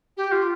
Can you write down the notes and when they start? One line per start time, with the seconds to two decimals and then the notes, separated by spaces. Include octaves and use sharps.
0.17 G4
0.32 F4